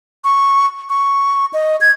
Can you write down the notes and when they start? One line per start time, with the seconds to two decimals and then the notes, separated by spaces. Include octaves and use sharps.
0.24 C#6
0.89 C#6
1.53 D#5
1.81 G#6